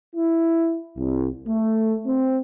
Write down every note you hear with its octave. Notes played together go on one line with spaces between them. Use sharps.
E4
C2
A3
C4